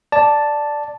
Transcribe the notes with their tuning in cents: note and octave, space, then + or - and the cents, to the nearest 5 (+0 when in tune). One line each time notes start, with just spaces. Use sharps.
D5 +0 A5 +0